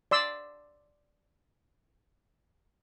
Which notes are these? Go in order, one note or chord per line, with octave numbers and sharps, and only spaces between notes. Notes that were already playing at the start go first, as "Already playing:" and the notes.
D5 C6 E6